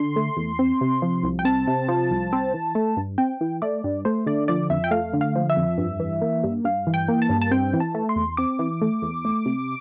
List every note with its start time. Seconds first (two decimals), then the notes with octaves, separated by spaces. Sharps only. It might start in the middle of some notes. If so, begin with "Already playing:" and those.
Already playing: D3 C6
0.16 A3
0.37 E2
0.59 C4
0.81 C3
1.02 F3
1.23 C2
1.39 G5
1.45 C4 A5
1.67 C3
1.88 F3
2.11 C2
2.33 C4
2.54 E3
2.75 A3
2.97 G2
3.18 C4 G5
3.41 E3
3.62 A3 D5
3.84 G2
4.05 A3 C5
4.26 D3 D5
4.48 F3 D5
4.70 F2 E5
4.84 G5
4.91 A3 F5
5.13 D3
5.21 F5
5.35 F3
5.50 E5
5.57 F2
5.78 G2
6.00 E3
6.22 A#3
6.44 G2
6.64 G2 F5
6.87 E3
6.94 G5
7.08 A#3
7.22 A5
7.30 G2
7.42 A5
7.51 C4 G5
7.73 E3
7.80 A5
7.95 A3
8.09 C6
8.16 E2
8.37 C4 D6
8.59 E3
8.82 A3
9.02 E2
9.25 A3
9.46 C3